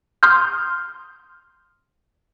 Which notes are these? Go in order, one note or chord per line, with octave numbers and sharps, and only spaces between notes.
C6 D#6 F6 G6